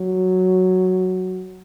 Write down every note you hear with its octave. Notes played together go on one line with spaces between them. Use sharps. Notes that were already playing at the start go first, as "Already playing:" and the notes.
Already playing: F#3